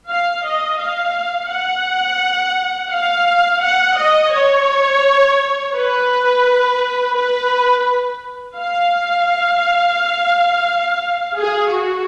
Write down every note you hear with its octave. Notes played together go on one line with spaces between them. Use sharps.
F5
D#5
F5
F#5
F5
F#5
D#5
C#5
B4
B4
F5
G#4
F#4